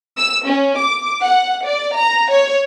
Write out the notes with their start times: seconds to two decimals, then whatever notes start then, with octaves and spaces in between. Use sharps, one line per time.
0.17 E6
0.46 C#4
0.77 D6
1.22 F#5
1.66 D5
1.97 A#5
2.32 C#5